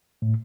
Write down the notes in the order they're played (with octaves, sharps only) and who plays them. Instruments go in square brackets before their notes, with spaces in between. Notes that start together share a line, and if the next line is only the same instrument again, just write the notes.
[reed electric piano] A2